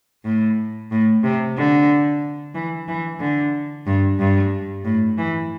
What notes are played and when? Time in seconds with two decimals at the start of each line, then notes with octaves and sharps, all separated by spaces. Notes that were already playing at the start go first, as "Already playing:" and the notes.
0.24 A2
0.91 A2
1.24 C3
1.56 D3
2.55 E3
2.88 E3
3.20 D3
3.86 G2
4.19 G2
4.85 A2
5.18 E3